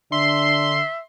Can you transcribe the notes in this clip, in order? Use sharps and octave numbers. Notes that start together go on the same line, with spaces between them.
D3 D4 E5 C6